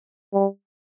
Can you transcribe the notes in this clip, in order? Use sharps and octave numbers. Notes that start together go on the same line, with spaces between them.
G3